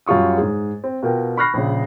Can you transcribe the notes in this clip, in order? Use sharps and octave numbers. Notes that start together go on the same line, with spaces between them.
F#2 G3 F4 C#6 D#6
G#2 G#4
C4
B2 F4 A#4 G5
B5 C#6 F6 F#6 A#6 C7
A#1 C#3